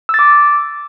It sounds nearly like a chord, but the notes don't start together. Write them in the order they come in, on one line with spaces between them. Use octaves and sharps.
E6 A6 D6